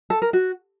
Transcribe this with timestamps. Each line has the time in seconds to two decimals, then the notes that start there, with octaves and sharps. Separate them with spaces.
0.10 A4
0.22 A#4
0.33 F#4